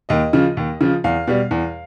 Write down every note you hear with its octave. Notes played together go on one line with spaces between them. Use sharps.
D#2 D#5
C#3 F3
D#2
C#3 F3
E2 F5
B2 G3
E2